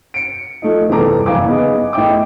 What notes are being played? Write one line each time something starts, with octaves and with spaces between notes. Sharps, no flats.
C#7 D7
F3 A3 D#4
E2 G2 C3 A4 A#5 D6
F#1 F5 G#5 D6
B3 D#4 G#4
A2 D#5 E5 G5 D6